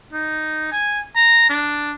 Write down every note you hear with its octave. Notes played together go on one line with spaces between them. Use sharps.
D#4
G#5
A#5
D4